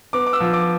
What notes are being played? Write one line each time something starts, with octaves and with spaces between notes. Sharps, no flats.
B3 D6
D6
E6
F3
D6